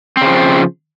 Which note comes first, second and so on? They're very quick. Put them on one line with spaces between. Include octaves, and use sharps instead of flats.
C4 C#3 F3